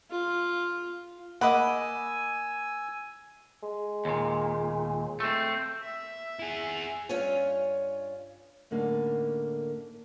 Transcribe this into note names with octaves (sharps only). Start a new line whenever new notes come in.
F4
A#3 D#5 F#5 G#5 B5 D6 E6
G#3
D#2 A#2
A3 C4
E5
E4 G#4
G2 C#4 F4 C#5 G#5
A2 D3 A#3 C#4 D#4